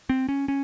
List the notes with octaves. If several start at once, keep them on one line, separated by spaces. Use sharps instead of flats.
C4
C#4
C#4